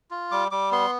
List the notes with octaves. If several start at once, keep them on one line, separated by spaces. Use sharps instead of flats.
F4
G3 D6
G3 D6
B3 C6